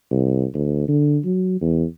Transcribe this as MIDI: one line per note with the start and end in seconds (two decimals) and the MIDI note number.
0.11 0.45 36
0.54 0.86 38
0.88 1.18 50
1.25 1.57 54
1.61 1.84 40